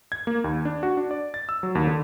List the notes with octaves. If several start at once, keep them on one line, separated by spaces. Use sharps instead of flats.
G#6
A#3
D#2
D4
F#4
D4
D5
A6
E6
F#3
D#2
D3